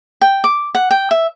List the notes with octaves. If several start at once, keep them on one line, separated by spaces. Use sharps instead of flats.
G5
D6
F#5
G5
E5